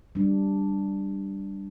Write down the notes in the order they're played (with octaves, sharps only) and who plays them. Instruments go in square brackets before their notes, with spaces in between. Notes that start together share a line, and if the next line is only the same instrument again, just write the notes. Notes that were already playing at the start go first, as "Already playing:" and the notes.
[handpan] G3 D4